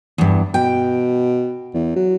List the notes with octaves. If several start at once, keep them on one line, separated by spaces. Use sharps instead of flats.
E2 G2
B2 G5
E2
F#3